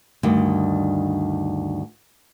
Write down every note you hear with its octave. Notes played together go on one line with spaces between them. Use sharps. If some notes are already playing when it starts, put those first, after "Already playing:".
D2 G2 D#3